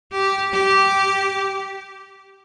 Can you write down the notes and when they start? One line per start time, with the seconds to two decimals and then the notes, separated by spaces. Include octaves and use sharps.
0.11 G4
0.53 G4